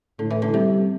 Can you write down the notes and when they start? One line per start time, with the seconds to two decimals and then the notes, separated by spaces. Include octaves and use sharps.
0.19 A2 D3
0.30 E3
0.42 D3
0.53 C3 G3